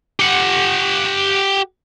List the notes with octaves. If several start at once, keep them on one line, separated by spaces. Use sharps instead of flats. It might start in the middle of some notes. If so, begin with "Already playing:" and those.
G4 F#5